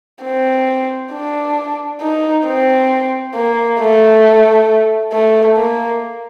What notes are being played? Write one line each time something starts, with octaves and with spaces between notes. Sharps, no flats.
C4
D4
D#4
C4
A#3
A3
A3
A#3